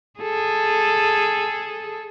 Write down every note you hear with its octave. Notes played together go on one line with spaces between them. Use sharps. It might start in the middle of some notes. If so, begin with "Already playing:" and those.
G#4 A4